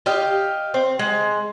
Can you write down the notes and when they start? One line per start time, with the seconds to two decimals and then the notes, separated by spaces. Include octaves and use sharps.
0.06 G4 D#5 F5
0.74 C4
0.99 G#3